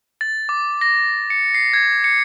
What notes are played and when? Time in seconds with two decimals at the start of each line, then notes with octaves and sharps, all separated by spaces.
0.21 A6
0.49 D6
0.81 A#6
1.30 C#7
1.54 C7
1.73 G#6
2.04 C#7